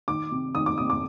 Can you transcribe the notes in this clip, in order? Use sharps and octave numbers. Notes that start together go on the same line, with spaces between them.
D#3 D6
C3
D#3 D#6
D6
C3 D#6
D6